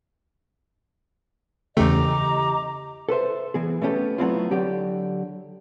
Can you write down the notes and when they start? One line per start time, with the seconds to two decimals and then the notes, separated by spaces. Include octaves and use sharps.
1.77 E2 C#3 E3 A3 G4 D#5 A#5 D6
3.09 A4 B4 C5 E5
3.54 E3 B3 G#4
3.82 A3 B3 C#4 G4 A4
4.18 F#3 A3 B3 C4 E4 F4
4.51 D3 F#3 G4